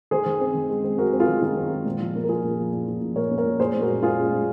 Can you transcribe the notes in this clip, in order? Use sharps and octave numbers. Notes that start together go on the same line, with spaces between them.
D#3 G#4 C5
D#3
C4
D#3
G#3
C4
G#3 F#4 A#4
C4
F4 G#4
D#3
D#3 F4
C4
G#3
A#2
F3
A#3
A#4
A#2 F4 G#4
A#2
F3
A#2
F3
A#2
A#2 A#4 C#5
A#3
A#4 C#5
A#2
A#2 G#4 C5
A#2
F#4 A#4
G#3
A#2 F4 G#4
G#3
A#2